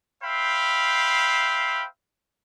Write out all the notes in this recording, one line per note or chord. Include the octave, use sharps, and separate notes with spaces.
C5 E5 F5 G5 B5